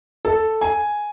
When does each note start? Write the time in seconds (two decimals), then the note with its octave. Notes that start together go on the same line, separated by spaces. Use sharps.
0.25 A4
0.61 G#5